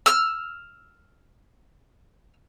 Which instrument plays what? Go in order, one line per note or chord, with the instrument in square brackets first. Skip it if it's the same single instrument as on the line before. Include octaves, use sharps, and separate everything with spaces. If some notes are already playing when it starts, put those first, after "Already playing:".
[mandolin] E6 F6